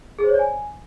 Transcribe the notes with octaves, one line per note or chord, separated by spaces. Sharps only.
G#4
C5
C#5
D5
G#5